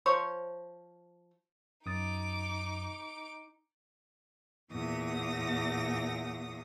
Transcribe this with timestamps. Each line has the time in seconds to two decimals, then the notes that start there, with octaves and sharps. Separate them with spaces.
0.06 F3 C5 C#5
1.86 F#2 D#4 D6 D#6 A6
4.71 E2 A#2 D#6 A#6